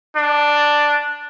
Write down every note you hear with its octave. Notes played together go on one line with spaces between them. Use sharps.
D4